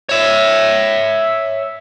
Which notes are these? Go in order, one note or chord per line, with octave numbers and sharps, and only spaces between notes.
C#5 E5